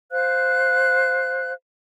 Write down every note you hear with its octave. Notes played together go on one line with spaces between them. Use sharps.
C5 F5 F#6